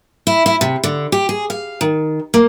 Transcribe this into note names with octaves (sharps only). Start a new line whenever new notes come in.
E4
E4
C3
D3
G4
G#4
F5
D#3
A#3